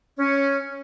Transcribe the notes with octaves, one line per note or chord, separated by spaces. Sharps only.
C#4